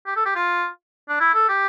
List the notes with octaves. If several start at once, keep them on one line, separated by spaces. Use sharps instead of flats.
G4
A4
G4
F4
D4
E4
A4
G4